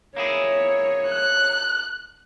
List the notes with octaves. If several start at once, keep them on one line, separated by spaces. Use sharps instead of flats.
A#3 E4 G#4 C#5
F#6